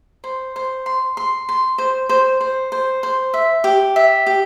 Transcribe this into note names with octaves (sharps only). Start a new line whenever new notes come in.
C5
C5
C6
C6
C6
C5
C5
C5
C5
C5
E5
G4
E5
G4